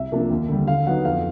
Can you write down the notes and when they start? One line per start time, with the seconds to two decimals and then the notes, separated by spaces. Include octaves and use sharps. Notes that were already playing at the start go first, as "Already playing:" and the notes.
Already playing: C2 E5
0.12 C3 F3 A#3 D4
0.30 D#2
0.49 D3 G3
0.67 D3 F5
0.87 F#3 B3 D#4 F#5
1.05 F2 F5